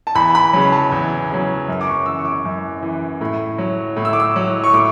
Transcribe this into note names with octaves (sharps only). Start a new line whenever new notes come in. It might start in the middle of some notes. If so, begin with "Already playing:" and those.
A5
E2 B5
B5
C#3 F#3
A5
E2
C#3 F#3
F#2
D6
C#6
E3 E6
C#6
D6
F#2
E3
A2
F#3
A2
E6
D6
E6
F#3
C#6
A2 D6